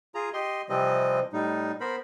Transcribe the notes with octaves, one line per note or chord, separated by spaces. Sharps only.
F4 G#4 A#5
G4 D#5 C6
C3 E3 F3 G3 C4 D#5
A2 G3 D#4
B3 A#4 C5 B5